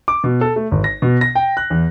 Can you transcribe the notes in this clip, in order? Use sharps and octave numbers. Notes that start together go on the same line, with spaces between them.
D6
B2
A4
A3
G#1
A#6
B2
A#6
G5
F#6
E2